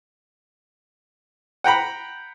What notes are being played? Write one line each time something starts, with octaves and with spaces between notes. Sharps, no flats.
F#5 G5 A#5 B5